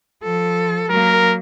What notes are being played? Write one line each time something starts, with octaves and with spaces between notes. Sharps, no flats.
F3 A4
F#3 A#3 A#4